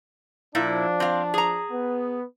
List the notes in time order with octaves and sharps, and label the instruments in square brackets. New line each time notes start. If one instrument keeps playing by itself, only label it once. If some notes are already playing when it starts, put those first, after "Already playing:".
[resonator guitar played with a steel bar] A#2 E4 [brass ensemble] F3 D4
[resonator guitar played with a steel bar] C4 F5
G#4 A#5
[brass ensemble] B3